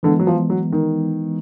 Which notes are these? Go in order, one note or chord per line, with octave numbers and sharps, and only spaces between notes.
D3 E3 G#3 B3
F#3
F3
F#3
D#3